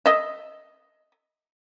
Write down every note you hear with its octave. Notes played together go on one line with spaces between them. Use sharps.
D#5 E5